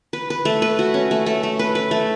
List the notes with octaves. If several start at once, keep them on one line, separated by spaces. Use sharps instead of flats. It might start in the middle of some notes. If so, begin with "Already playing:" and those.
B4
B4
A3
B4
F#4
C#4
A3
A3
A3
B4
B4
A3